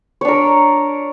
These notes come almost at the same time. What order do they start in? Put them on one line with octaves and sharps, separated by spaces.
C#5 D4 A#4